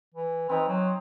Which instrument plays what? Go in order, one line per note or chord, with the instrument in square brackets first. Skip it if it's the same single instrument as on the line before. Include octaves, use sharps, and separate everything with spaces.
[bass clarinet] E3
[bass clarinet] E3 [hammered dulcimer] C4 D#4 C6
[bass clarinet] F#3